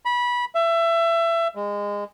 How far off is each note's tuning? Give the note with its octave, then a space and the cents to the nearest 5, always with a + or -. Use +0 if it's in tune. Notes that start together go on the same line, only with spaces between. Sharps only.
B5 -20
E5 +25
G#3 -25